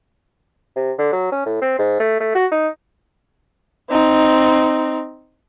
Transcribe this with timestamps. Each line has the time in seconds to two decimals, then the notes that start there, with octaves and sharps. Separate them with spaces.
0.76 C3
0.98 D3
1.12 F#3
1.32 C#4
1.46 A2
1.62 C4
1.79 G#2
2.00 A3
2.20 A3
2.35 F#4
2.52 D#4
3.90 C4 D#4